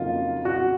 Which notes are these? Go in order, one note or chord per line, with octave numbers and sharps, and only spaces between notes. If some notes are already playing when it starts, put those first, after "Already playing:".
Already playing: F2 C#3 F#3 A#3 D#4 F4
F#4 F#5